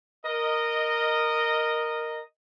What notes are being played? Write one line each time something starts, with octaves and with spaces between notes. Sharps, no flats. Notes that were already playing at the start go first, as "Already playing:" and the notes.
A#4 D#5